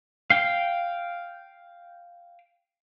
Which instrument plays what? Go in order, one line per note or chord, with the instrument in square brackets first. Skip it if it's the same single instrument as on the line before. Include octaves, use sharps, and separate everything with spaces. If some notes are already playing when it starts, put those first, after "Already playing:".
[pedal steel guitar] F5 G5